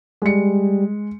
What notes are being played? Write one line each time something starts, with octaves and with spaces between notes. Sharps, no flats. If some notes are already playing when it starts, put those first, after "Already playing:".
G3 G#3 C#7